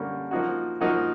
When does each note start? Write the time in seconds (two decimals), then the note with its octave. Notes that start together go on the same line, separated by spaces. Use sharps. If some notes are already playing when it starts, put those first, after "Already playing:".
Already playing: D3 G3 A#3 C#4
0.31 F3 A#3 D#4 F#4
0.81 F3 A#3 D#4 F#4